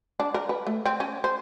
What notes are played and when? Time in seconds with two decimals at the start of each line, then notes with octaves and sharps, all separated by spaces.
0.20 D4
0.34 A#4
0.49 B4
0.67 A3
0.86 C4
1.00 C#4
1.24 C5